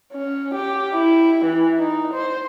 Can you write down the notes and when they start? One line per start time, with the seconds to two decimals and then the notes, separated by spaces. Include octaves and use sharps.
0.12 C#4
0.55 G4
0.94 E4
1.45 E3
1.79 D#4
2.14 C5